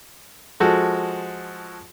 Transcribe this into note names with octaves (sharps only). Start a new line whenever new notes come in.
F3 G#3 F#4 A4